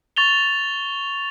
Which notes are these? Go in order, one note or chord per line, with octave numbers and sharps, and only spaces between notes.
C#6 A6 F7 G7